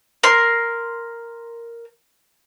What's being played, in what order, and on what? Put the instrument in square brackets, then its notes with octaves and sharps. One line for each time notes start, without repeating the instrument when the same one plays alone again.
[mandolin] A#4 C6